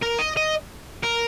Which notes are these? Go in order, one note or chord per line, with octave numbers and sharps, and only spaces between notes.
A#4
D#5
D#5
A#4